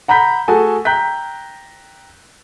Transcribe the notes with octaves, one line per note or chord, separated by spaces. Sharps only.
F#5 A#5 B5 G6 B6
A3 F#4 G#4 A4 G#5 A5
G5 A#5 F#6 G6 B6